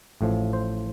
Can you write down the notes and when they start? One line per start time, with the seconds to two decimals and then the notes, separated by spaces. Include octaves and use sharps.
0.21 A1 A2 F3
0.53 C5